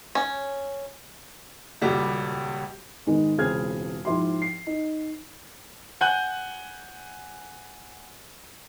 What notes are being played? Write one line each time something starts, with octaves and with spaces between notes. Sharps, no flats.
C#4
D#1 C#2 G3 F#4
G#2 D#3 G#3 B3 D#4
E1 C#2 C4 G#4 F6 G#6
G#2 F3 E4 G4 C6
C7
D#4
F#5 G#5 F#6 G6